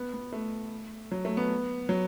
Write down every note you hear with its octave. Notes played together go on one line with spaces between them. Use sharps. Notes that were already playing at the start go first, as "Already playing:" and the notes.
Already playing: B3
B3
A3
F#3
A3
B3
F#3